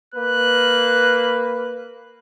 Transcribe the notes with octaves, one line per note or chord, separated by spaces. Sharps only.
A#3 B4 F#6